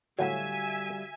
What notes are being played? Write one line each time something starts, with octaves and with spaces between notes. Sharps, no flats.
A2 D3 F#3 G3 F#4 E5 F5 G#5